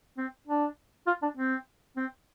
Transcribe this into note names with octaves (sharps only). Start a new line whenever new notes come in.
C4
D4
F4
D4
C4
C4